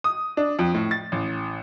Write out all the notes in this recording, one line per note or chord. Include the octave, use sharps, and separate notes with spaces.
D#6
D4
F2
A2
A6
A1